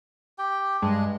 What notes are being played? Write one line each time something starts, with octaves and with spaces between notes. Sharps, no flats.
G4 G5
G2 G#3 D4